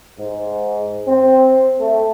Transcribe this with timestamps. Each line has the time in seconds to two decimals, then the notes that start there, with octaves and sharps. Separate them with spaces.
0.18 G#2
1.07 C4
1.79 A3